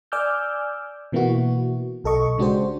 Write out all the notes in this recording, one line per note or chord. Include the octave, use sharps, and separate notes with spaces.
D5 G#5 D6 E6 F6 G6
B2 E3 A#3 B3 E4 F#4
B1 A4 D#5 C#6
C#3 G#3 D4 F#4 G4 C5